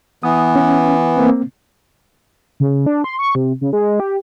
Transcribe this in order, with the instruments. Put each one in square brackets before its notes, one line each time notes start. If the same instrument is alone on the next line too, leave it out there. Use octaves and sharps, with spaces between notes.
[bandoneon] E3 B3 [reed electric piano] D#6
[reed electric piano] C#4
A#3 C4
[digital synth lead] C#3
D4
C6
C#6
C3
C#3
G#3
G4